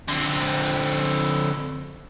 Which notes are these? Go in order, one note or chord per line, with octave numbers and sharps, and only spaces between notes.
D3 C4